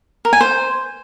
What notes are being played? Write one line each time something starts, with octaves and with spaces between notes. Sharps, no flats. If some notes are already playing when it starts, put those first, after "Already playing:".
A#4
G#5
C5